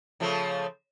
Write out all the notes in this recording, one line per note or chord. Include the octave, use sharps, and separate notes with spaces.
C#3 F3 A3